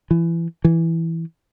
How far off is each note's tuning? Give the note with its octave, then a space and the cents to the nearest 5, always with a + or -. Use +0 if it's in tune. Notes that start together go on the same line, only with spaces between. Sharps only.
E3 +25
E3 +0